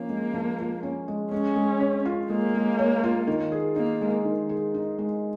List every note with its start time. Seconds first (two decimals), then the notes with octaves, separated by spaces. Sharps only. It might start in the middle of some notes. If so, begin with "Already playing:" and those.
Already playing: F3 A#3 C#4 F4
0.09 G#3
0.34 F3
0.59 F4
0.83 C#4
1.08 G#3
1.32 G#3 C#4
1.56 G#3
1.80 C#5
2.05 F4
2.30 G#3 A#3
2.54 G#3
2.79 C#5
3.04 F4
3.27 D#3
3.52 G#4
3.76 A#3 D#4
4.01 G#3
4.25 D#3
4.49 G#4
4.74 D#4
4.98 G#3